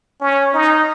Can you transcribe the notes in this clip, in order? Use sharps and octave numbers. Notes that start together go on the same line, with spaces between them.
C#4
D#4